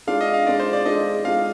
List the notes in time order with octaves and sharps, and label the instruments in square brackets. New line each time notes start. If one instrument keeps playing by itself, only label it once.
[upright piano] G#3 D4 F4 [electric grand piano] F5
[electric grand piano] D#5
F5
[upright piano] G#3 D4 F4 [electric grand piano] D5
[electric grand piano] C5
D5
[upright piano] G#3 D4 F4 [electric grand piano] D#5
[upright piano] G#3 D4 F4 [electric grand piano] F5